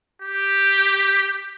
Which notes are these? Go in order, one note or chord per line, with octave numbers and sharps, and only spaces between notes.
G4